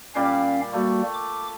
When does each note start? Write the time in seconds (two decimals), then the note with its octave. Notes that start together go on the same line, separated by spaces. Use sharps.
0.15 A#2 G3 C#4 D5 F5
0.74 G3 A3 A#3 F#4
1.14 D6